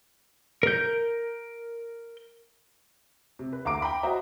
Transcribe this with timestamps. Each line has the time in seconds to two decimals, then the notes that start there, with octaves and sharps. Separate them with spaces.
0.63 A#4 G6
3.39 C3
3.53 B4
3.65 D2 F5 A#5 D6 D7
3.82 G5 A#5 B5
4.03 F#4 C5 D#5 E5 A#5